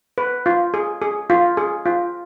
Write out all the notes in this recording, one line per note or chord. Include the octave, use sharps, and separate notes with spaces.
B4
F4
G#4
G#4
F4
G#4
F4